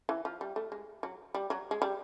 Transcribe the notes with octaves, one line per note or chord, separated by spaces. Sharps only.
E3
F3
G3
A3
G#3
F#3
G3
F#3
G#3
G3